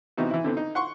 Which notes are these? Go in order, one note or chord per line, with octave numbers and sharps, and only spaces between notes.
C3 E3 B3 D#4 F#4
E3 E4
D3 B3 C4
D#4
F#5 C6 C#6